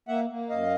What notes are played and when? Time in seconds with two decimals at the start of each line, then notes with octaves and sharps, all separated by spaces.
0.08 A#3 E5 F#5
0.30 A#3
0.49 F#2 D#5 F5